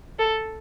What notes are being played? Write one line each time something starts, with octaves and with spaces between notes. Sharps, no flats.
A4